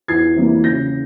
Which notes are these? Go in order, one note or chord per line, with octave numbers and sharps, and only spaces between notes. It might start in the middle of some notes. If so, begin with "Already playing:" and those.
E2 G#6 C7
C3 E3 G3 A#3
C#3 G6 A#6